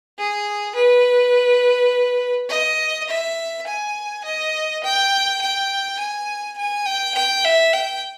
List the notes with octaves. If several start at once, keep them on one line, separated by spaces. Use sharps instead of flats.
G#4
B4
D#5
E5
G#5
D#5
G5
G5
G#5
G#5
G5
G5
E5
G5